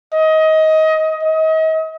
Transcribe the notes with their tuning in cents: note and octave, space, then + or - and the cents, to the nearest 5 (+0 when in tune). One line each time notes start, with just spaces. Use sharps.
D#5 +20
D#5 +35